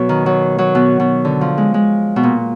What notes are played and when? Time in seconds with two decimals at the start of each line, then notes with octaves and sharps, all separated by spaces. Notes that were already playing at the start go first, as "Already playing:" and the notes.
Already playing: B2 F#3
0.09 D#3
0.26 F#3
0.58 F#3
0.75 B2
1.00 B2
1.25 D3
1.41 F3
1.57 G#3
1.74 G#3
2.16 B2
2.23 A#2